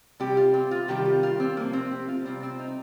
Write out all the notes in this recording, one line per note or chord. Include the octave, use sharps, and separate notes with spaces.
C3 G3 G4
F4
C4
F4
C3 D#3 G3 G4
F4
F4
C4
C3 F3 A#3
C4
G4
F4
C3 G3 C4
C4
D#4